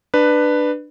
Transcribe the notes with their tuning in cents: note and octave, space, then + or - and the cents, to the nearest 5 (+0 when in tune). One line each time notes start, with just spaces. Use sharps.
D4 +20 B4 +0